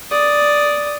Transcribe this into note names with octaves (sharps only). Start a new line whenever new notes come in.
D5 D#6